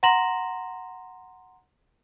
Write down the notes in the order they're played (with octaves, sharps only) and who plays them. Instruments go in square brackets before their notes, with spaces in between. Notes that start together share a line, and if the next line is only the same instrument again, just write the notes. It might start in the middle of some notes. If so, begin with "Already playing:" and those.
[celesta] F#5 A#5 C6 A#6 E7 F#7